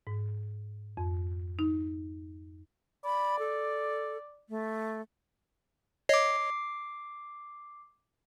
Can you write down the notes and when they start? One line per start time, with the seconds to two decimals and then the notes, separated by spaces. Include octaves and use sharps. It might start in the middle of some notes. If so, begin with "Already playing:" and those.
0.07 G#2
0.97 F2
1.59 D#4
3.05 D5 B5
3.39 A4
4.49 A3
6.09 C#5 D#5 D6 C7